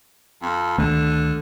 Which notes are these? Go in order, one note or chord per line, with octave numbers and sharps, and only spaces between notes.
F2
D2 D3 D#3 A3